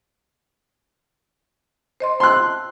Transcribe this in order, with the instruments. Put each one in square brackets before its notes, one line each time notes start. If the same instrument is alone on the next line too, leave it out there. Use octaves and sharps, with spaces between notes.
[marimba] C5 D#5 C6
[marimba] A5 E6 [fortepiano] C6 F#6